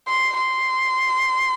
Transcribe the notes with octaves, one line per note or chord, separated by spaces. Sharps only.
C6
C6